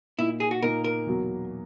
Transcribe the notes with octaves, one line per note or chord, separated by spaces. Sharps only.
A#2 A#3 D#4 E4
G#4
F#4
A#2 A#3 D#4 A#4
A#4
E2 B2 F#3 A#3